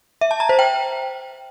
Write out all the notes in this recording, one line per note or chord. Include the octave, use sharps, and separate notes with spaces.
E5
A5
A#5
C5
G5